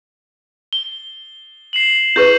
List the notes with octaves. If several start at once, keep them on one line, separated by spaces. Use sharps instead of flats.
G7
C7 E7 F#7
E4 G#4 B4 C#6 G6